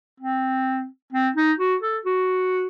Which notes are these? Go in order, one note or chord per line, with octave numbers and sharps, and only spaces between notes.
C4
C4
D#4
F#4
A4
F#4